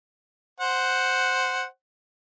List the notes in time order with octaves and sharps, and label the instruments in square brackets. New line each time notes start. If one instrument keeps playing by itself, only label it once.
[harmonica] C5 F#5